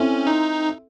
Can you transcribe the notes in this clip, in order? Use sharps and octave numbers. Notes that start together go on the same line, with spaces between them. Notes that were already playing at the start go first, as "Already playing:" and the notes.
Already playing: C4 C#4 E4 A4 C5 E5
D#4